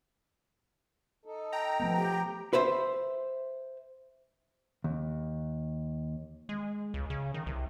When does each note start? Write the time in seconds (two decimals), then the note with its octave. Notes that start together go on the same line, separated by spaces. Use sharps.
1.25 D#4 A4
1.52 G5 A#5
1.80 F3 A3 B3
1.97 G4
2.53 B4 C5 E5
4.84 D#2
6.49 G#3
6.94 C#2
7.10 C#3
7.34 D#3
7.46 C2